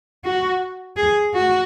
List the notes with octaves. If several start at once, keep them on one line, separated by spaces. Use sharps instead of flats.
F#4
G#4
F#4